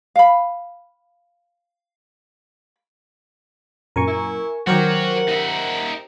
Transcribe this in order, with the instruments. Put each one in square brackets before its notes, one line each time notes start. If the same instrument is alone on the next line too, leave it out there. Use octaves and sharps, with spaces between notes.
[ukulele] F5 B5
[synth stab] F#2 A#2 [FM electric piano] A#4 G#5 C#6
[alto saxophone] E4
[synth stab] D#3 F#3 [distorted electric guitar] F#4 C#5 [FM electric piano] G4 A#4 C5 [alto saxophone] F#5
[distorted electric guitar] D#4 E5